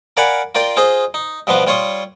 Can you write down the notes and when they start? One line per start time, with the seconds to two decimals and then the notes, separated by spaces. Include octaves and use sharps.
0.17 A#4 D5 F5 F#5 G#5 B5
0.55 F4 A#4 D5 G5 C6
0.77 F4 G#4 C5 D#5
1.14 D#4
1.47 G2 B2 F3 B3 C6 D6
1.67 G3 F4 C#5 C6 D#6